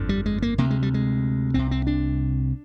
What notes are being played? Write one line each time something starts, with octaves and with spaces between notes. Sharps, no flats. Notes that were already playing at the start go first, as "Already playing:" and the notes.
Already playing: G1 F2 D3
G3
G#3
A#3
D2 C3 A#3
G#3
G3
G#3
C2 C3 C4
C4
D4